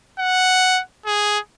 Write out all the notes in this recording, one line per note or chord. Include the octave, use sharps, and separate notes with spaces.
F#5
G#4